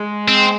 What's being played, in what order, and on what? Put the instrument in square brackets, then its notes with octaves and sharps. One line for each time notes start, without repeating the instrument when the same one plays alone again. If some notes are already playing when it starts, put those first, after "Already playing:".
Already playing: [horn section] G#3
[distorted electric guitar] C4